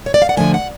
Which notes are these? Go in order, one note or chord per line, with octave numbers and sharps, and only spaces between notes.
C#5
D5
F5
F#5
D3 F3 A3 G#5
F#5